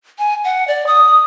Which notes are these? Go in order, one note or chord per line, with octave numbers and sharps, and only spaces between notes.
G#5
F#5
D5
D#6